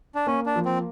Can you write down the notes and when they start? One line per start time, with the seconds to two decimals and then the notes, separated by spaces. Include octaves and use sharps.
0.15 D4
0.27 A#3 C#4
0.46 D4
0.56 F3
0.65 C4